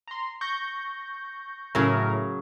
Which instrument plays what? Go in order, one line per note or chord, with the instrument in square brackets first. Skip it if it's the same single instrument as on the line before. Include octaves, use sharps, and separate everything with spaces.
[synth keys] A#5 C6
C#6 G6 A#6
[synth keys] A2 A#4 [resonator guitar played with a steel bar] C#3 F#3